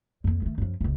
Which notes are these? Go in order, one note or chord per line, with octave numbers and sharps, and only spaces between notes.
F2 A#3
D#3 A3
F#2 F3
D1 C#2